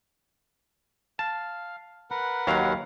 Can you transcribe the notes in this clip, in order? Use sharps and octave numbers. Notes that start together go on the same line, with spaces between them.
F5 A5
A#4 B4 F#5
D#2 F#3 F5